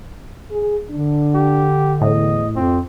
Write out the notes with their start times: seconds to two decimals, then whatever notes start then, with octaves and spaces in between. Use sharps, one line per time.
0.51 G#4
0.90 D3 D4
1.35 G4
2.01 E2 A2 D#5
2.56 F2 C4 F4